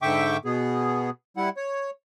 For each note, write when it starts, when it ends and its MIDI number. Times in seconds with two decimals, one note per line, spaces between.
0.02 0.37 44
0.02 0.37 50
0.02 0.37 76
0.02 0.37 79
0.02 0.37 85
0.02 0.37 86
0.45 1.10 47
0.45 1.10 59
0.45 1.10 68
1.37 1.49 55
1.37 1.49 64
1.37 1.49 78
1.57 1.90 73